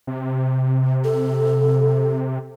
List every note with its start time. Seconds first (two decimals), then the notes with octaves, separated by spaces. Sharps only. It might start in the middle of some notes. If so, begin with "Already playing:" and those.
0.07 C3
1.04 A4